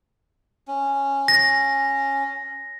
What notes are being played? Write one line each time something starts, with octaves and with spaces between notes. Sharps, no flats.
C#4
A#6